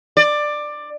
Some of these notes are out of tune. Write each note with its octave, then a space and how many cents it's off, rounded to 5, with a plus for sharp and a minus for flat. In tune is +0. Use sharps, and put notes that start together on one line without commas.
D5 +15